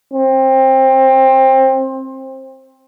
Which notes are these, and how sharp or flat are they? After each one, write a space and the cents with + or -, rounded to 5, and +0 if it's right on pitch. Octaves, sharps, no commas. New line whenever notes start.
C4 +20